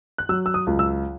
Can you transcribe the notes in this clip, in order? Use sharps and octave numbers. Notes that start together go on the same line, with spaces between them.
F#6
F#3 E6
E6
D#6
C#2
E6